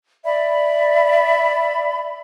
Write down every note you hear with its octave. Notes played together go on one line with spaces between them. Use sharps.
D5 E5 B5